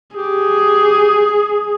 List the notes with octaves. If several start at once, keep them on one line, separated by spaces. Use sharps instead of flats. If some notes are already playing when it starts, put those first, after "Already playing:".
G4 G#4